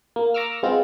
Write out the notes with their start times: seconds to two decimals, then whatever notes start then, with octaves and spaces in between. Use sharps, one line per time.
0.16 A#3
0.34 A#5 C#6 D6 E6 F6
0.63 G#3 B3 C4 F4